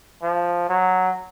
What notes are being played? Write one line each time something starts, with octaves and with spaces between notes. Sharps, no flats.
F3
F#3